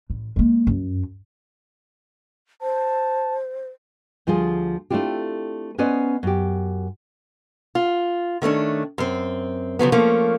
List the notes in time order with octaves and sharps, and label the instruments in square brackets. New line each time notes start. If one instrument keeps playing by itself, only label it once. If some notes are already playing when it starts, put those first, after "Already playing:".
[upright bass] A1
G#3 A#3
F#2
[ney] C5 [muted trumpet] A5
[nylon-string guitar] D2 F3 G3 F4 G#4
A3 C4 D4 E4 F4 G4
B3 C#4 B4 C5 D5 D#5
F#2 G4
[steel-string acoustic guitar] F4
D#3 A3 C#4 D4
F#2 C4
C#3 F3 F#3 B3
F3 A3 A#3 C#4